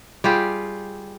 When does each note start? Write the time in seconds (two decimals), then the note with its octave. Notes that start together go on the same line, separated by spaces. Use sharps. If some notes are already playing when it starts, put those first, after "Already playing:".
0.24 G3 F4 G4 G#4